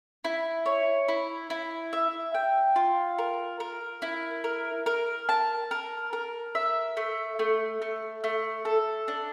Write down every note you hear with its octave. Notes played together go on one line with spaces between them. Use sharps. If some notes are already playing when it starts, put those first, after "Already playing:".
E4
C#5
E4
E4
E5
G5
F4
A#4
A#4
E4
A#4
A#4
A5
A#4
A#4
E5
A3
A3
A3
A3
A4
D4